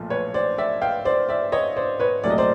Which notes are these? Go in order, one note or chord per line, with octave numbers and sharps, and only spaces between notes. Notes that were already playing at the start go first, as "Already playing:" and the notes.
Already playing: B1 A#2 F3 A3
B4 C#5
C5 D5
D5 E5
F5 G5
C5 D5
D5 E5
C#5 D#5
C5 D5
B4 C#5
C2 A#2 F#3 A3 D5
D#5
C5 D5